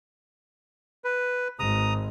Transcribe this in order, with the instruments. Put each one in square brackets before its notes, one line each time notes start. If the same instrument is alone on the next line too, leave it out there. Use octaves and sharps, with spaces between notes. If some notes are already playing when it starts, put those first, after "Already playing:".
[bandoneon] B4
[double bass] G#1 [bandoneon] A#5 D#6